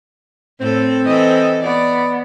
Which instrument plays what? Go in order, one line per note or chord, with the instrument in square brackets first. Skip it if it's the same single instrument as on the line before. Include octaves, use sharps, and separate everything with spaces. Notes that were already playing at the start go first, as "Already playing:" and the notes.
[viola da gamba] A2 A4 [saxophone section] C4
[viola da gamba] E3 A4 [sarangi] D#5
[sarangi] B3 [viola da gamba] D5